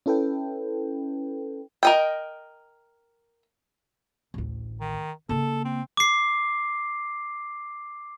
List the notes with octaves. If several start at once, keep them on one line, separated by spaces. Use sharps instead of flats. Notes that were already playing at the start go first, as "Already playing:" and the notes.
C#4 E4 A4 B4 G5
A#4 D#5 G5
A1 D2
D#3
C#3 A#3 A4
C4
D6 C7